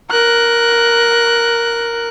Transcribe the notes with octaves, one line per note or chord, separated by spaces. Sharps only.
A#4 F#6